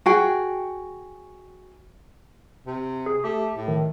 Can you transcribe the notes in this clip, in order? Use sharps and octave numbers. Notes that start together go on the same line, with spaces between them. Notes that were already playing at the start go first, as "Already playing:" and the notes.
F#4 G#4 G5
C3
G#4
A3 G4
A2
D#3